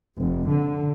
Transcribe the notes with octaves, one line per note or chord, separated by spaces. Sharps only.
F1
D3